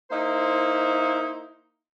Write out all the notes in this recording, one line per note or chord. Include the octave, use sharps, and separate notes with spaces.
A#3 D#4 E4 C5